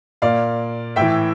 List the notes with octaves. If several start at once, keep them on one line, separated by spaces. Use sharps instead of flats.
A#2 D5 F5
A2 E3 E5 G5